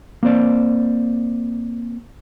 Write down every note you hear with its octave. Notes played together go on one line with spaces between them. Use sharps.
A#3 C4 C5 D5